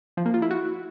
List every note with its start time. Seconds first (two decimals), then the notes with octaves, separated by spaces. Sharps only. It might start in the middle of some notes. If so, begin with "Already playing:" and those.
0.17 F3
0.26 A#3
0.34 F4
0.42 E4
0.51 F#4